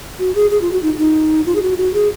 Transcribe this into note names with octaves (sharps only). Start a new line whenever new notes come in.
F#4
G#4
G#4
F4
F#4
D#4
D#4
F4
G#4
F#4
F#4
G#4